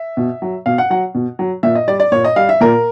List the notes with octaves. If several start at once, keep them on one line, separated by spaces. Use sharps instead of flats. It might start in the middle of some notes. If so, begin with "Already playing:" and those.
Already playing: E5
B2
F#3
B2 F5
F#5
F#3 F#5
B2
F#3
A#2 E5
D#5
G3 D5
D5
A#2 C#5
D#5
G3 F5
E5
A#2 A#4